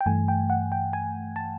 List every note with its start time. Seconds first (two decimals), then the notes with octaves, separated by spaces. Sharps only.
0.01 G5
0.06 G2 E3 A3 G#5
0.28 G5
0.50 F#5
0.72 G5
0.93 G#5
1.36 A5